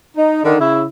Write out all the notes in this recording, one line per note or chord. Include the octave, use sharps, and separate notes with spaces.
D#4
D3 D#3
C#3 E4